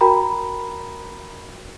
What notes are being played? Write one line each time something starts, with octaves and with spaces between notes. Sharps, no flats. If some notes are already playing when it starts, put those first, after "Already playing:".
F#4 A#4 G5 A#5 B5